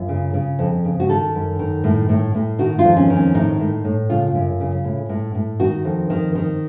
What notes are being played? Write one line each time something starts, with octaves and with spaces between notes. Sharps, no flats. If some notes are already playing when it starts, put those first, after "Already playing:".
Already playing: F#2 F4
C#3
C#3
F2
C#3
F#4
D#3 A4
F#2
D#3
A2
A2
A2
D#3 F#4
F4
F2
C#4
D#3
C#4
A2 D#4
A2
A2
C#3 F4
F#2
C#3
A2
A2
A2
D#3 F#4
F2
D#3
D#3